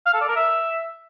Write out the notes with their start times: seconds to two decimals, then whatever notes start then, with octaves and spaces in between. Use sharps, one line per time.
0.06 F5
0.14 A4
0.21 D5
0.29 A#4
0.36 E5